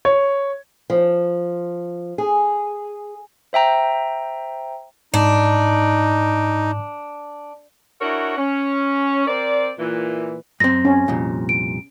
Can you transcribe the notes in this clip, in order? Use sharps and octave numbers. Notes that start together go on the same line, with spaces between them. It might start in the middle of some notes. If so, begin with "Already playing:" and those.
C#5
F3
G#4
C5 E5 G5 A#5
G#2 D4 D#4
D4 E4 F#4 A#4 C#5 F#5
C#4
C4 A#4 C5 D5
A#2 E3
F#2 C4 A#6
C#4
C2 F2 A#2
D7